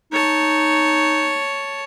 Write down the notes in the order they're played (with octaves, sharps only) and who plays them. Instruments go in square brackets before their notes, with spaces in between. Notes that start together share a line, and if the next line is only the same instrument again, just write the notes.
[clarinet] D#4 [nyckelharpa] C#5 A5